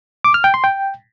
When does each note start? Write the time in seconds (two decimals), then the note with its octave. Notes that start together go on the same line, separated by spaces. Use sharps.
0.24 D6
0.34 F6
0.44 G5
0.54 C6
0.64 G5